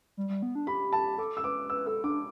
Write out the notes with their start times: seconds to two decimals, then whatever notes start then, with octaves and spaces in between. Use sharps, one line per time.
0.17 G3
0.29 G3
0.42 B3
0.55 D4
0.67 G4 B5
0.93 A5
1.18 A4 D6
1.37 E6
1.44 B4 D6
1.70 B4 E6
1.86 A4 E6
2.04 D4 D6